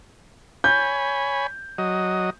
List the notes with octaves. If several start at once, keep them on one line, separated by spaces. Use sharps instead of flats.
C#5 G#5 B5 G6
F#3 D#5